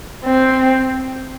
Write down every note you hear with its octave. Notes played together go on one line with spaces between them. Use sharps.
C4